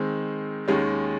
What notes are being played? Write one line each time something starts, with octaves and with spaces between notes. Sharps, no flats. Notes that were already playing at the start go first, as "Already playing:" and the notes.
Already playing: D#3 G#3 C4
D#2 D#3 G#3 C#4